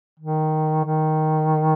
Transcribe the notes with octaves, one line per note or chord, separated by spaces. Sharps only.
D#3
D#3